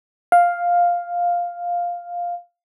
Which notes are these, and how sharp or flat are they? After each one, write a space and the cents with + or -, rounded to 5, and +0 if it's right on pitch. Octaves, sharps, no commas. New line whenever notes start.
F5 +5